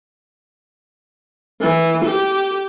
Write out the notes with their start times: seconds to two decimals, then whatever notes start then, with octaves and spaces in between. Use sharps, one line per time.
1.61 E3
2.05 G4